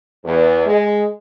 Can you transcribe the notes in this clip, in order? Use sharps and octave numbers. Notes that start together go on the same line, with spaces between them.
E2
G#3